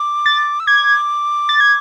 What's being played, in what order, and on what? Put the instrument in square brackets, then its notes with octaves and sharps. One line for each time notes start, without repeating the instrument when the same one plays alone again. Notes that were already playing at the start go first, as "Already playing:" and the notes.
Already playing: [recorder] D6
[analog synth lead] A6
[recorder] E6
[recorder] D6 [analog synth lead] G#6
[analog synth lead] A6
G#6